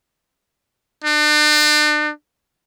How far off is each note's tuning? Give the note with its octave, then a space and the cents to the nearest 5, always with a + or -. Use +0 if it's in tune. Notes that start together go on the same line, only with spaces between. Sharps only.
D4 +40